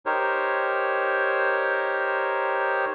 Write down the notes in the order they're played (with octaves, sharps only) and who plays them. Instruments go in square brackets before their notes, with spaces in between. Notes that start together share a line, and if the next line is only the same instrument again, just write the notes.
[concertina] D#4 G4 A#4 C5 C#5